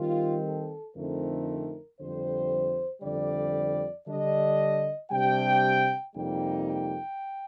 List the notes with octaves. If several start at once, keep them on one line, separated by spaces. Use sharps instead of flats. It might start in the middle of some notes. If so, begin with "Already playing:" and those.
Already playing: D#3 G3 C4 F4
A4
F2 D3 A3 C4 D#4 A#4
F2 D3 G3 C5
F2 D3 G3 D5
D3 G3 D4 D#5
C3 G3 D4 G5
F2 C3 G3 A#3 D#4 G5
G5